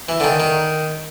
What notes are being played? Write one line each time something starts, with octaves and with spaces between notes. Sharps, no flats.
E3
D3
D#3
D#3